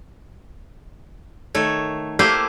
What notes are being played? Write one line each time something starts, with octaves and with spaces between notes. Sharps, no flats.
D#3 A3 C#5
A3 A#3 E4 G4 C5 F5